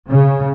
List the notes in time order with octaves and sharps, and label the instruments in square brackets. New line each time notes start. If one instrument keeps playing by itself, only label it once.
[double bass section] C#3